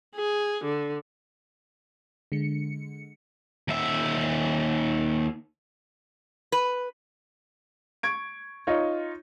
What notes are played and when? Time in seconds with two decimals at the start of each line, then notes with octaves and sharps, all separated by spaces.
0.16 G#4
0.64 D3
2.32 D3 G#3 C#7
3.68 D#2 E5
6.52 B4
8.03 C#6 G#6 D7
8.67 D#4 F4 C#5